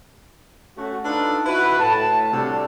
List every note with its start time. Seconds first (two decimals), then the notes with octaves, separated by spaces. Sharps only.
0.76 A3 C#4 F#4
1.04 D4 D#4 F4 A4 B4
1.44 E4 F#4 B4
1.80 A2 A5
2.33 C3 G3 D4 F#4 A4